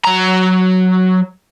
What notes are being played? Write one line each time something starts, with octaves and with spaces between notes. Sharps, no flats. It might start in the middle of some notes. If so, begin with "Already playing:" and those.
F#3 A#5